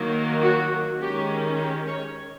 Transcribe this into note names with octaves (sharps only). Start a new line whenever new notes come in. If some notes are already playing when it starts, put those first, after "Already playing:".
Already playing: D#3 F#3 A#3
F#4
D#3 G#3 C#4 G4
G4
C#5